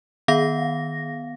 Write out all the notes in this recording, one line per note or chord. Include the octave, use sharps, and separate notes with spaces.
D#3 B3 F5 A#6